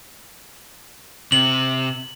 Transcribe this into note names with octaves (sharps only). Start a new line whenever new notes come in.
C3 F#7